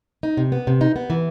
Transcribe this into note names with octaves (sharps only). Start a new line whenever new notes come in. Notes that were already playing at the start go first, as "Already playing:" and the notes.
D#4
C3
B3
C3
D#4
B3
E3